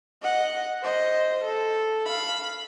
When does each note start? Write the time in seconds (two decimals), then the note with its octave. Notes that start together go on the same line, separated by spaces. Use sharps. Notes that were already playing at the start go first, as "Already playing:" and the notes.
0.22 D#5 F#5
0.82 C5 D#5
1.44 A4
2.06 F5 B5